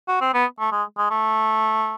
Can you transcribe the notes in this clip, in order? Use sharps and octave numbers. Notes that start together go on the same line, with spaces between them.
F#4
C4
B3
A3
G#3
G#3
A3